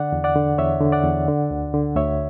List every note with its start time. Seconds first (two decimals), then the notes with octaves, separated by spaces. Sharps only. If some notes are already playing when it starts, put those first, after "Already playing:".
Already playing: D3 D5 F#5
0.12 E2
0.24 D5 F#5
0.36 D3
0.58 E2 C#5 E5
0.81 D3
0.92 D5 F#5
1.04 E2
1.28 D3
1.51 D2
1.73 D3
1.96 D2 C#5 E5